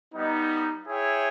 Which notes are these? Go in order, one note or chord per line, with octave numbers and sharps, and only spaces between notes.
G3 B3 D#4
E4 G#4 C#5 E5 G5